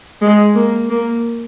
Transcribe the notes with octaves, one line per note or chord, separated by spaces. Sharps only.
G#3
A#3
A#3